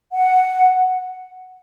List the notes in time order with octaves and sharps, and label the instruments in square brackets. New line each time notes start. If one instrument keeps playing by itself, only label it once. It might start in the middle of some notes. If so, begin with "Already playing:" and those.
[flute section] F#5